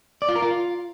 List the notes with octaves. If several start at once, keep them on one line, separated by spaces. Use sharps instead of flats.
D5
F4
A#4
F4